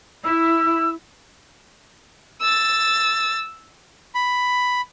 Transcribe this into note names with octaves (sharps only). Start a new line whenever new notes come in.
E4 E6
E6 A6
B5